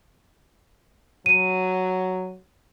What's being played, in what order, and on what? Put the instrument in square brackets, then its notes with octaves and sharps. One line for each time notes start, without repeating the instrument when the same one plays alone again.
[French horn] F#3 [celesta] D#7